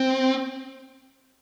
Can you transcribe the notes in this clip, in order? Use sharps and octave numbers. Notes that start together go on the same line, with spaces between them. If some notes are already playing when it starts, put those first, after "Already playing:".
Already playing: C4